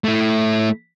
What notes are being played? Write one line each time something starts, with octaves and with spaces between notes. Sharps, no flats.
A3 E4